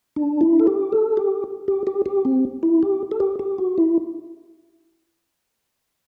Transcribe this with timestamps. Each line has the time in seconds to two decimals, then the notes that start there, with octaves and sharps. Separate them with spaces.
0.16 D4
0.41 E4
0.60 A4
0.67 G4
0.92 A4
1.17 G4
1.68 G4
1.87 G4
2.06 G4
2.25 C4
2.63 E4
2.83 G4
3.11 A4
3.20 G4
3.39 G4
3.58 F#4
3.78 E4